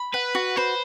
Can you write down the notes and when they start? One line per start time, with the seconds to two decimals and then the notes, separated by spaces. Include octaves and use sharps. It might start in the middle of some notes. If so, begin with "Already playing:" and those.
Already playing: B5
0.14 B4 F#5
0.35 F#4
0.56 B4 C5